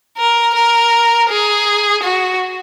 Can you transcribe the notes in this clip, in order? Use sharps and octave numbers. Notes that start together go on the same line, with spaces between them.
A#4
A#4
G#4
F#4